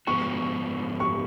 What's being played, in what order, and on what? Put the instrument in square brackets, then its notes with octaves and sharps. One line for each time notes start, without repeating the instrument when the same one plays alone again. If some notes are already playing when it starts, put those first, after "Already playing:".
[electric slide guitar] G#2 F3 B3 F#4 [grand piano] C#6
[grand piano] C#6